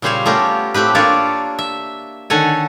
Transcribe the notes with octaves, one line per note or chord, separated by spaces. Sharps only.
A#2 C#3 G3 C5 C#5 F5
A3 B3 C#4 F4 G4 A#4
A2 A3 C4 G4 B4
A#3 D4 F4 A4 C#5 D5
E5
D3 D#3 A4 C#5 F#5 G#5